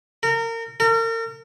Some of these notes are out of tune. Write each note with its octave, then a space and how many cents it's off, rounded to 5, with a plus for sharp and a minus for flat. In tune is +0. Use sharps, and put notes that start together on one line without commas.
A#4 -30
A#4 -40